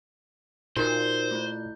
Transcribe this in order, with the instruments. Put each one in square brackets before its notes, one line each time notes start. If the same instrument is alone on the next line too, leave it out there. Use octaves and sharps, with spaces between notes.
[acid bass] A#2 [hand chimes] D#4 F#4 A#4 [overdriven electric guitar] C5
[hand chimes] A3 E4 G6